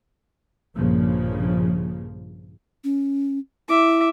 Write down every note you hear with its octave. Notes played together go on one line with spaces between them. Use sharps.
A#1 G2 C#3 F3 A#3
C#4
E4 E5 D6